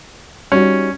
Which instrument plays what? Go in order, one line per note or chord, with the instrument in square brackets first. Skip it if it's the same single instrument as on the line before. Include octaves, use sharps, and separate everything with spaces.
[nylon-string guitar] G3 D#4 F#4 [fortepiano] C#4